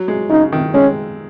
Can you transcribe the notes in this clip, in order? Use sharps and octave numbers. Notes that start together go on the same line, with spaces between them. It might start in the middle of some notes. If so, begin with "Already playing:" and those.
Already playing: F#3
G#3
C#3 D#4
D#3
G#3 C#4